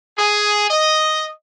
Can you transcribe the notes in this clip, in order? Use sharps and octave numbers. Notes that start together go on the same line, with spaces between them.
G#4
D#5